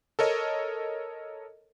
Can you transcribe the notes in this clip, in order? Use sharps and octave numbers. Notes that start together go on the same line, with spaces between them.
A4 A#4 C#5 D#5